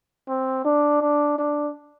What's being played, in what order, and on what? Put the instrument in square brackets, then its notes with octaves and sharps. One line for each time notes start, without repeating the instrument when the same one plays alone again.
[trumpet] C4
D4
D4
D4